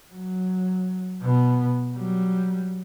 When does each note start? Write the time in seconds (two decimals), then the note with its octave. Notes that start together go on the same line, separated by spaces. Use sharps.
0.11 F#3
1.20 B2 B3
1.94 F#3 G3